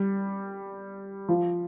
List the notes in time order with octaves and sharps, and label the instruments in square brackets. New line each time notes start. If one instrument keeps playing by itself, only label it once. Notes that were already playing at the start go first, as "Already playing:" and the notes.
Already playing: [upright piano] G3
F3